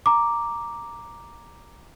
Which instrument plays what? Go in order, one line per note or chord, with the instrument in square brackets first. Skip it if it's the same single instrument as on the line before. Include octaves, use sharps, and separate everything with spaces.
[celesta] A#5 D6